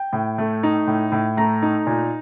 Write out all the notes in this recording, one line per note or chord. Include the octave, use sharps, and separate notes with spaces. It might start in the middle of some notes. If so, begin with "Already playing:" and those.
Already playing: G5
A2
A3
D#4
A2
A2
A3 A#5
D#4
A#2